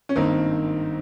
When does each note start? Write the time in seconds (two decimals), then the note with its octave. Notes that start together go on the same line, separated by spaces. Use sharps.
0.09 C#4
0.15 G#1 G2 D#3 A#3 C4 D#4